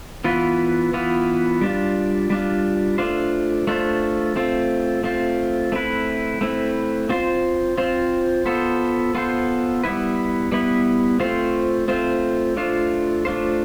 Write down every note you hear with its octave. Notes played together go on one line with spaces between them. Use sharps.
E3 B3 F4 B4
E3 B3 F4 B4
G3 D4 F4
G3 D4 F4
A3 D4 F4 C5
A3 D4 F4 C5
A3 C4 F4
A3 C4 F4
A3 C4 E4 B4
A3 C4 E4 B4
C4 F4 C5
C4 F4 C5
B3 F4 A4 C5
B3 F4 A4 C5
G3 B3 E4 B4
G3 B3 E4 B4
A3 C4 F4 C5
A3 C4 F4 C5
A3 D4 F4 C5
A3 D4 F4 C5